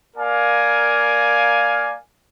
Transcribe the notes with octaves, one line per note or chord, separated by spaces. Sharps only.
A#3 A#4 D5 F5 G#5